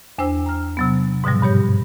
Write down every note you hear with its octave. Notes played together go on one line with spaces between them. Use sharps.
E2 D4 C5 G5 E6
A#5 F6
C3 F#3 B3
G#2 B2 D3 F3 G3
G2 G4 C#5 G6